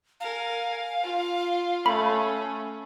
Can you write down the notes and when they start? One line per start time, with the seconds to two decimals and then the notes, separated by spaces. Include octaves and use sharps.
0.20 A#4 F5 G#5
1.03 F4
1.86 A3 C#4 B5